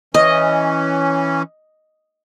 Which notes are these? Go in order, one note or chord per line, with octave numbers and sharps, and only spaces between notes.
E3 C#4 D#5